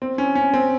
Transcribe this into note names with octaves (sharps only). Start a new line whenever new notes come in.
C4
C#4
C#4
C4